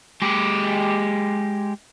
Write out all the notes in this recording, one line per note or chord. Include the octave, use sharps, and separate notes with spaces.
G#3 G4